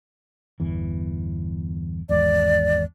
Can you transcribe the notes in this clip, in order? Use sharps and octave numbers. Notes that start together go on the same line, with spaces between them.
G1 E2 E3
G#1 E2 G#3 D5